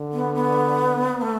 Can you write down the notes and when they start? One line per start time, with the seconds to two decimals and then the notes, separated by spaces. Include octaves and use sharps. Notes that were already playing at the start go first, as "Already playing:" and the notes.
Already playing: D3
0.13 B3
0.35 B3
1.22 A3